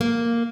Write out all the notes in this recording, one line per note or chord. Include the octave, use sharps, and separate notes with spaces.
A#3